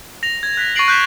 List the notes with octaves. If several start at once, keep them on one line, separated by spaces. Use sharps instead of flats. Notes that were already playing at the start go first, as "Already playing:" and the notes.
A#6 F7
G#6
F#6 B6
C#6 A6 A#6 C7 D7 F#7
F#6 G6 B6 E7